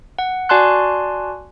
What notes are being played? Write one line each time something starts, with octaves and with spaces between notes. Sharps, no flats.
F#5
F#4 D5 G#5 A5 C6 F#6